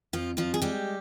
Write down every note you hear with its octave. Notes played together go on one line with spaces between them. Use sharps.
F2 F3 F4
F2 F3 F4
G#4
G3 G#3 G4